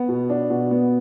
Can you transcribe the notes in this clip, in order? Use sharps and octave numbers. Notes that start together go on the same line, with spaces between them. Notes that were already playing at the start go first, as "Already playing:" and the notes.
Already playing: B3
B2
D4
B2
B3